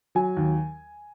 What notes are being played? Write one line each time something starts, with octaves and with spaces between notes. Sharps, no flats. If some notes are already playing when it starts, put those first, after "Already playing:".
F#3 G#5
D#2